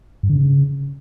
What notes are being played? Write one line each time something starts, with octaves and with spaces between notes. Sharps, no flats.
G2
D3
C#3